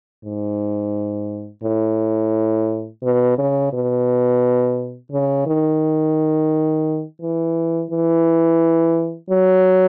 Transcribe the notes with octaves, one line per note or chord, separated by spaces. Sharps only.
G#2
A2
B2
C#3
B2
C#3
D#3
E3
E3
F#3